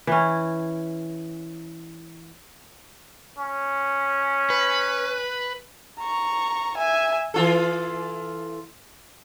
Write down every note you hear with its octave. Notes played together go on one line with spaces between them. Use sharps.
E3 C#4
C#4
B4
A#5 C#6
E5 G#5
E3 F4 A4